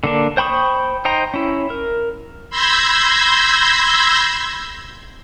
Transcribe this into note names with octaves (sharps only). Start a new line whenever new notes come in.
D3 A#3 D4
C5 G5 B5 C#6 D#6
D#4 C5 G5 A#5
C#4 E4
A#4
B5 C6 E6 G6 G#6 A#6